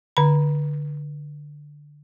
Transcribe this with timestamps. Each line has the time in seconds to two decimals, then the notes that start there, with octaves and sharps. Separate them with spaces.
0.17 D3 B5